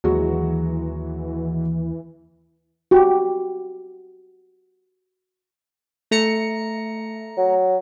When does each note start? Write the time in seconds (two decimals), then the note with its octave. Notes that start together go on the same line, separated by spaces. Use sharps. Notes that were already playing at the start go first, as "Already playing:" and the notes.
0.04 D#2 E3 F#3 G#3 F#4
2.91 F#4 G4
6.11 A3 A#5 C#7
7.37 F#3